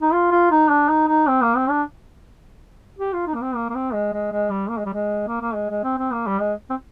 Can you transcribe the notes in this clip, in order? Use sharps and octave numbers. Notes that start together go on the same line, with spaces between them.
D#4
F4
F4
D#4
D4
D#4
D#4
C4
A#3
C4
D4
G4
F4
D#4
A#3
C4
A#3
A#3
C4
G#3
G#3
G#3
G3
A#3
G#3
G3
G#3
A#3
A#3
G#3
G#3
C4
C4
A#3
G3
G#3
C4